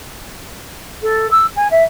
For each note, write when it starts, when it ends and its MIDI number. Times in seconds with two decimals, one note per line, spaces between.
1.03 1.29 69
1.31 1.46 88
1.56 1.68 80
1.71 1.83 76